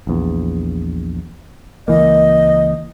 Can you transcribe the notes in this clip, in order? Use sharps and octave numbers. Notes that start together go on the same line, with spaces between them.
A#1 E2
C#2 E3 A#3 D#5